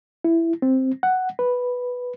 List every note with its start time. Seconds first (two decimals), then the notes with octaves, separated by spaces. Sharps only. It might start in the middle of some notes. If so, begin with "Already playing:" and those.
0.24 E4
0.62 C4
1.03 F#5
1.39 B4